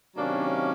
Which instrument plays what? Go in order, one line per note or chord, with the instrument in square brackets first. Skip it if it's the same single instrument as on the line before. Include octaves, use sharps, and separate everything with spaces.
[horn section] C3 D#3 F#3 A#3 C#4 D4